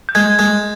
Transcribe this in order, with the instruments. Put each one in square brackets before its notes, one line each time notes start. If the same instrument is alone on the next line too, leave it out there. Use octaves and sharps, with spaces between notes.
[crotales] G6
[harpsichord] G#3 [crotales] G#6
[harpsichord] G#3